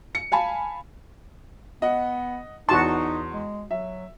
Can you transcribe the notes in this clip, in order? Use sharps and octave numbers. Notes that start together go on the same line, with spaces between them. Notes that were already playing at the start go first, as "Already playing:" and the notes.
C#7
F5 G#5 A5 B5
B3 D#5 F#5
E2 D#4 F#4 A5 C6
G#3
F#3 E5